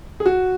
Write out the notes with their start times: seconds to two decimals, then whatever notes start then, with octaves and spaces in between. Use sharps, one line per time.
0.20 G#4
0.26 F#4